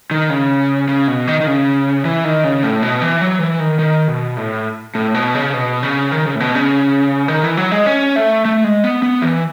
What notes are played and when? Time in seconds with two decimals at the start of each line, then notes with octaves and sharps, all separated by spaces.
0.11 D#3
0.30 C#3
0.88 C#3
1.08 B2
1.27 D#3
1.40 D#3
1.47 C#3
2.05 E3
2.24 D#3
2.44 C#3
2.63 A2
2.82 B2
3.02 E3
3.21 F#3
3.40 E3
3.60 D#3
3.79 D#3
4.08 B2
4.37 A2
4.95 A2
5.14 B2
5.35 C#3
5.54 B2
5.83 C#3
6.12 D#3
6.26 C#3
6.35 A2
6.40 B2
6.55 C#3
7.28 D#3
7.43 E3
7.57 F#3
7.71 G#3
7.86 C#4
8.16 A3
8.45 A3
8.64 G#3
8.84 B3
9.03 B3
9.22 E3